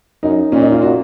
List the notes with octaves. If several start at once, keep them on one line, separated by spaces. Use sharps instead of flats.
F#2 D#4
A#2 C#4
D#4
F4
F#4